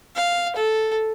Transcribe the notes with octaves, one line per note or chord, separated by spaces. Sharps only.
F5
A4